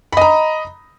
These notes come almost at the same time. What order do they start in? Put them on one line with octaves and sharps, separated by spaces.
B5 D#5 A#5